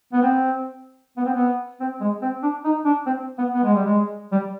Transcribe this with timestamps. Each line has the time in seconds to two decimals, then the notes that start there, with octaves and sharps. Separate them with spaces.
0.13 B3
0.22 C4
1.17 B3
1.26 C4
1.34 B3
1.80 C4
2.01 G#3
2.22 C4
2.43 D4
2.64 D#4
2.85 D4
3.06 C4
3.38 B3
3.54 B3
3.64 G#3
3.74 G3
3.85 G#3
4.32 G3